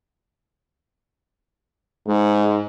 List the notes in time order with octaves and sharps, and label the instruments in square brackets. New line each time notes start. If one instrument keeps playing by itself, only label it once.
[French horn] G#2 [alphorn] G#3